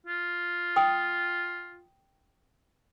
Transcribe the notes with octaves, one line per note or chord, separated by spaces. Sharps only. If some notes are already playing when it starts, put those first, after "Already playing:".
F4
G5 D#6